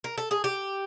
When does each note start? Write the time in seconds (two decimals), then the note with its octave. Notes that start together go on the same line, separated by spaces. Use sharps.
0.04 A#4
0.18 A4
0.31 G#4
0.44 G4